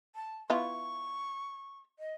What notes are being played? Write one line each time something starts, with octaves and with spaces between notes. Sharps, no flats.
A5
B3 E4 F4 C#6
D#5